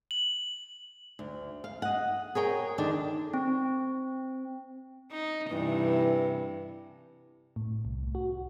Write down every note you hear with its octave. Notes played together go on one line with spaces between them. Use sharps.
F#7
D2
F5
D#5 F#5
G#4 A#4 C#5 G5
D3 D#3 D4
C4
D#4
G2 C3 E3
A2
C2
F#4